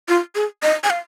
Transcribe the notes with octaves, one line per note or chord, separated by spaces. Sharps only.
F4
G#4
D#5
G#5
F5